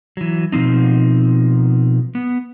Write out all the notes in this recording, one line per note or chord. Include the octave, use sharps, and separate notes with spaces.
E3 F#3
B2 F3 C4 D#4
B3